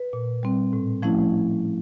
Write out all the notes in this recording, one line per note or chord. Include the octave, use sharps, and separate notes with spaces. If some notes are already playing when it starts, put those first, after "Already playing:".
Already playing: B4
A#2
G3 C4
A2
F3 A3 C#4 E4